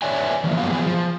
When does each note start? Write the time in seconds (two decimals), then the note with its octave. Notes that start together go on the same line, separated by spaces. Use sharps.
0.02 B4 C#5 D5 E5 G#5
0.44 E3 F3 A#3
0.57 G2 F#3 B3 F5
0.70 E3 F3 B3 G#4
0.86 F3